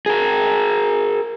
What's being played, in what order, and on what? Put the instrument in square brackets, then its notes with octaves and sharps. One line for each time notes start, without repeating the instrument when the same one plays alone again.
[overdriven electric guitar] G#4 A#4